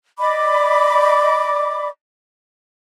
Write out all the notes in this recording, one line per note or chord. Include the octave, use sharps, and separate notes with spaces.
D5 D#5 B5 D6